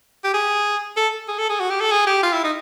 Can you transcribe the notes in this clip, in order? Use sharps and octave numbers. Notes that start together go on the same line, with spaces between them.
G4
G#4
A4
G#4
A4
G#4
F#4
G4
A4
G#4
G4
F4
E4
D#4